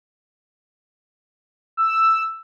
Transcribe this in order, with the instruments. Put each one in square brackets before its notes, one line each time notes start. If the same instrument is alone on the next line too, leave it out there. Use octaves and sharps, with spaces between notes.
[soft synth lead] E6